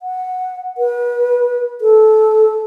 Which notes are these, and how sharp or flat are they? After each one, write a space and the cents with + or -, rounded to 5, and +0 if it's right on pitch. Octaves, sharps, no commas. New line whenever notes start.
F#5 -5
B4 -35
A4 -20